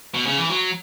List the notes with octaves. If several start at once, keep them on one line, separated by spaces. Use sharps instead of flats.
B2
C#3
E3
F#3